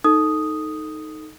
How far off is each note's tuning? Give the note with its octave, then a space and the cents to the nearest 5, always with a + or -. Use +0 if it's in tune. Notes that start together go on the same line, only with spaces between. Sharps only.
D#4 +0 A4 +0 D#6 +0